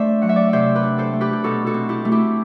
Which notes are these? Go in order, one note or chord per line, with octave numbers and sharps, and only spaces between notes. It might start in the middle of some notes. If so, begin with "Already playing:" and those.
Already playing: A3 D4 C5 D5 E5
F#3 F#5
E5
D5 F#5
C3 C5 E5
G4 B4
D4
A4 C5
A3
G4 B4
G4
B2 F#4 A4
F#4 A4
C4
E4 G4
A3
E4 G4